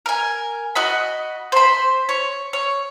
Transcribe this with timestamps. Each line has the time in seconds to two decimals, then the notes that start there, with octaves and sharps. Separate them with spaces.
0.06 A#4 G#5
0.75 F#4 D#5 B5
1.52 C5 B5
2.09 C#5
2.53 C#5